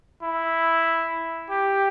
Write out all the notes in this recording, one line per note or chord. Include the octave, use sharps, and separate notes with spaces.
E4
G4